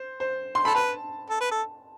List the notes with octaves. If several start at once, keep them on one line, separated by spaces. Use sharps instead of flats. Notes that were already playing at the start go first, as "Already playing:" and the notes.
Already playing: C5
C5
C6
A4 B5
B4 A5
A4
B4
A4